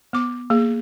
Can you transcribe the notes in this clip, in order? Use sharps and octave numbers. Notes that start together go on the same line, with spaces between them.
B3 D6
A#3 G#4